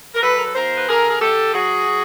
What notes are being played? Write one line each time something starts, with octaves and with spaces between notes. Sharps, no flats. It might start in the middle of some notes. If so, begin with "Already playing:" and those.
A#4
F#3 A4 B4
A#4
B4
D#2 A#4 C5
B4
D3 G#4 A#4
G#4
D3 G4 A4
F#3 F#4 G#4
F#3